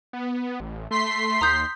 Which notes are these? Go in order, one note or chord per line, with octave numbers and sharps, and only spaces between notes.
B3
A1
A3 C6 B6 C7
D#2 A#5 D#6 G6